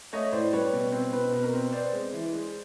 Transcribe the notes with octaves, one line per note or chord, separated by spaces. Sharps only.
A3 C#5 D#5
A2 C5 D5
G3 B4 C#5
B2
C4
B2 B4
B2 B4
A#4
C4
B3 C5 D5
G#3
E3
G#3